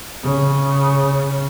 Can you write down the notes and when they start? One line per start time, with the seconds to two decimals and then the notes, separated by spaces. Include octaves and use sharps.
0.24 C#3